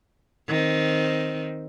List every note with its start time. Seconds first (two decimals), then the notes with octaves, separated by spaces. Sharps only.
0.48 D#3 C4